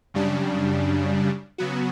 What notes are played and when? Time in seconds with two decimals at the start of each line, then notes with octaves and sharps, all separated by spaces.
0.14 F#2 C#3 G3 D4
1.58 C#3 F#3 B3 F#4